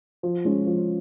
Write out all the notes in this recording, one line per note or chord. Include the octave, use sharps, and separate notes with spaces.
F3
G#3 C#4 F4
F3